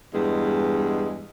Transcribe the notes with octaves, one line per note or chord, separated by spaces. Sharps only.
E2 G2 G#3